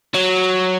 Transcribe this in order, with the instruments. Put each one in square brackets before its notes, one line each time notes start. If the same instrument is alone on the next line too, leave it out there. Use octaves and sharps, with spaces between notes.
[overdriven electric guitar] F#3